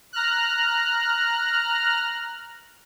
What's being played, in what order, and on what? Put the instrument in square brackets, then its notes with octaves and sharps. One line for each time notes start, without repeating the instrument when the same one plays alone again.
[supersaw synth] A#5 F6 F#6